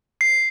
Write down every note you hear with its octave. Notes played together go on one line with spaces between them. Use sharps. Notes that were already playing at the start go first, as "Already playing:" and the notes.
C7